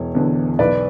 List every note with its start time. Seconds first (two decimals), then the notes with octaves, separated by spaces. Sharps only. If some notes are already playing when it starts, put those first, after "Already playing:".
Already playing: E1 C#5
0.15 E2 D3
0.59 B1 B4 D5